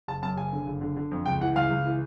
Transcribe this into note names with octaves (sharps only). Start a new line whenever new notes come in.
F#1 A5
F#2 A5
F#1 G#5
D3
F#1
D3
D3
F2
C#2 G5
E3 F#5
C#2 F5
C#2
E3